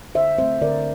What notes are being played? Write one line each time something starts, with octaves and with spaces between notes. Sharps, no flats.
D3 C5 E5
A3 C4 C5 E5
D3 A#4 D5